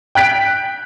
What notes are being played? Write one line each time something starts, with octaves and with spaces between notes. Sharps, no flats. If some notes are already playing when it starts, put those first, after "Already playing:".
G5 F#6 B6 D7